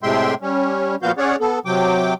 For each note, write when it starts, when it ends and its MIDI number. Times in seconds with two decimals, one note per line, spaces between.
0.03 0.34 45
0.03 0.34 48
0.03 0.34 56
0.03 0.34 76
0.03 0.34 79
0.03 0.34 84
0.42 0.95 55
0.42 0.95 61
1.02 1.12 46
1.02 1.12 53
1.02 1.12 59
1.02 1.12 66
1.02 1.12 77
1.02 1.12 91
1.18 1.36 61
1.18 1.36 68
1.18 1.36 73
1.18 1.36 74
1.18 1.36 78
1.40 1.59 59
1.40 1.59 69
1.66 2.14 48
1.66 2.14 54
1.66 2.14 79
1.66 2.14 86